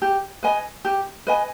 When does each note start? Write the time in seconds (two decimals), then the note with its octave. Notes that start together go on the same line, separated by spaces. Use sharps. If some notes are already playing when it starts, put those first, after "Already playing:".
0.02 G4
0.43 B4 D#5 G#5
0.85 G4
1.27 B4 D#5 G#5